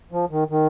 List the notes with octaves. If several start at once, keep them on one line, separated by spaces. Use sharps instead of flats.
F3
D#3
D#3